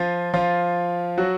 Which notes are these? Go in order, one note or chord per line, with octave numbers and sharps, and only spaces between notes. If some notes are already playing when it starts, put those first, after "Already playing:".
Already playing: F3 F4
F3 F4
F#3 F#4